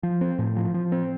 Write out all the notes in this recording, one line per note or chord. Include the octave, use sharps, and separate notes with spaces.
F3
C4
A2
F3
F3
C4